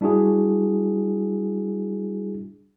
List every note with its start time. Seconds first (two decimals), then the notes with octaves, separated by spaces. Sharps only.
0.01 G3 D4 E4 F#4 G#4